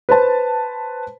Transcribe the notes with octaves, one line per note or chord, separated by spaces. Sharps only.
B4 C5 A5